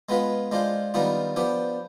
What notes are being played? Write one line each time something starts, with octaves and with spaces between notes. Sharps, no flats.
G#3 B3 F4 B4
G#3 D4 F4 C5
D#3 G3 B3 D4 F4
F3 B3 D4 G4